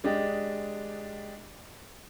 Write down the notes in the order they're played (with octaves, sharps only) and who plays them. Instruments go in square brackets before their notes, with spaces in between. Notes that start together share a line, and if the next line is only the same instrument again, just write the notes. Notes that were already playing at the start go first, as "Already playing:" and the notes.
[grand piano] G#3 D4 G4 D#5